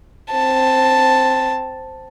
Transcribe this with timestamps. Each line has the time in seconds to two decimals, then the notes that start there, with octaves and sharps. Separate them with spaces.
0.31 C4 A5